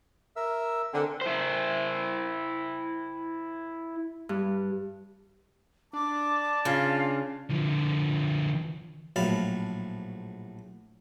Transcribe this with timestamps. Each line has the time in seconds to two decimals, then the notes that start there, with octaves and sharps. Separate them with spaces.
0.36 A#4 E5 E6
0.94 D3 C4 A#4 G#5
1.21 E4 C5
4.29 G2
5.93 D4 A5 D6
6.65 C#3 F4
7.50 D3 F3
9.16 A#1 A2 F#3 F5 A5 B5